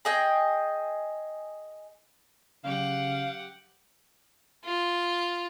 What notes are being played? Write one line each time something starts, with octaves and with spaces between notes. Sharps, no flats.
G#4 D#5 G5
C#3 F#3 C#4 G4 F5 F#5
F4